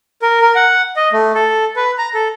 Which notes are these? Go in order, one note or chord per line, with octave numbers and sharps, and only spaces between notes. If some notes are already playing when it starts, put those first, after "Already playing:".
A#4
A#4
F#5
D#5
A3
A4
B4
A#5
A4